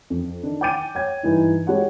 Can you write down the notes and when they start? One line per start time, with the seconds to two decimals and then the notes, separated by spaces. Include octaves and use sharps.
0.10 F2
0.43 D#3 D4
0.61 G5 G#5 D6 G6 A6 D#7
0.95 C#5 G5 G#6
1.23 G2 E3 D#4
1.67 G#3 G4 C#5 F#5